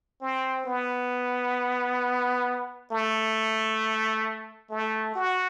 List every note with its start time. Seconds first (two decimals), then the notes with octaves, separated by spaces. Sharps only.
0.22 C4
0.66 B3
2.92 A3
4.71 A3
5.16 F#4